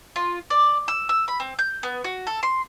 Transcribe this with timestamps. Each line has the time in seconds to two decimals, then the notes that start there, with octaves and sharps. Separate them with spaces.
0.16 F4
0.50 D5
0.88 E6
1.09 E6
1.28 B5
1.40 C4
1.59 G6
1.83 B3
2.04 F#4
2.27 A4
2.43 C6